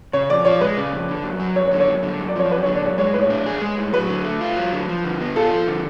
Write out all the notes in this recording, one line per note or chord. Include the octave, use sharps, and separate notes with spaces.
C#3 C#5
F2 D5
F3 C#5
G#3 B4
C#3
F2
D3
F#2
F#3
F#2 C#5
C#5
D3
C#5
F#2
D3
F#2
D5
F3 C#5
F#2 B4
D3 C#5
D5
F#2 C#5
G#3 C#5
A2 B4
C#5
D4
G#4
G#3
A2
F#3 B4
D3
A3
F4
F#3
D3
F3
D3
B3
F4 A4
F3
D3